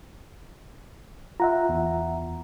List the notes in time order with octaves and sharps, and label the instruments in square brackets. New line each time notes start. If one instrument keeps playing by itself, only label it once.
[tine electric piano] F4 [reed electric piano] E5 F#5 A#5
[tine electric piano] E2